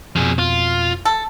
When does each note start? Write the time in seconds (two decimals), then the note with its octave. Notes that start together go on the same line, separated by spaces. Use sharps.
0.15 F2 B2 F3 G#4
0.39 F4
1.05 A4